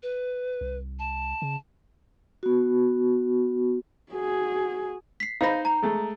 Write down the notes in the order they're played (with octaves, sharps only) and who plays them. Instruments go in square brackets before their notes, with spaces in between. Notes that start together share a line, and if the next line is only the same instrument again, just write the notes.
[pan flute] B4
[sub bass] C2
[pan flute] A5
[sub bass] C#3
[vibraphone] B3 F#4
[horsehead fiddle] F#4 G#4
[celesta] B6 C7
[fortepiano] D#4 C5 B5 [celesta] F5 A#6
[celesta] A#5
[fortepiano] G#3 A3